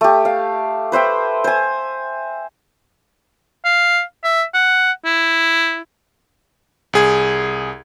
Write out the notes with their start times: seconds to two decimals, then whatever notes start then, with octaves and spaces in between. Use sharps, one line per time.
0.01 A3 G4
0.25 F5
0.92 B4 C5 E5 G5
1.44 C5 G#5
3.65 F5
4.24 E5
4.54 F#5
5.05 E4
6.93 C2 G#4 G#6